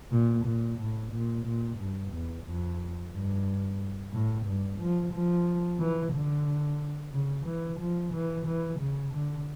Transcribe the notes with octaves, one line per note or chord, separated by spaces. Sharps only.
A#2
A#2
A2
A#2
A#2
G2
E2
F2
G2
A2
G2
F3
F3
E3
D3
C#3
E3
F3
E3
E3
C#3
D3